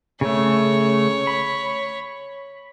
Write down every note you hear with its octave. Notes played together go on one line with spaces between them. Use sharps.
C#3 A3 C#5
B5